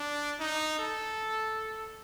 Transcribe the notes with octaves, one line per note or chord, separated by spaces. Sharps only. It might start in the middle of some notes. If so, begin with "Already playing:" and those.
Already playing: D4
D#4
A4